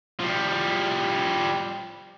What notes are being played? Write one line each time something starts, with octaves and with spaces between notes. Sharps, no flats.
F3 G3